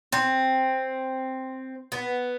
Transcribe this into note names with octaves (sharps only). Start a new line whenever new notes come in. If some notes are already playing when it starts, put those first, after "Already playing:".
C4
B3